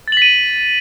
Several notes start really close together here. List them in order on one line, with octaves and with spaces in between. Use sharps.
A6 F#7 B6 D#7